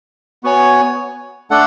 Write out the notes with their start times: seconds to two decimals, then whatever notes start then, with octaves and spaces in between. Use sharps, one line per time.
0.44 B3 F#4 C#5 G#5
1.51 A3 D4 A4 D5 F#5